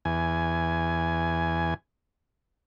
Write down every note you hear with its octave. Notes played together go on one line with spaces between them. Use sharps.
E2 G#5